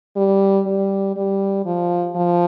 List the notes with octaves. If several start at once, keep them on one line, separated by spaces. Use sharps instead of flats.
G3
G3
G3
F3
F3